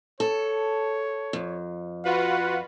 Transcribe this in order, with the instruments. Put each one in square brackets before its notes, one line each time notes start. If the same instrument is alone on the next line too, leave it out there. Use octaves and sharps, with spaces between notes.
[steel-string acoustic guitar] A4 [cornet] C#5
[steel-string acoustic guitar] F2
[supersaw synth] F4 F#4 B4 [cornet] F#5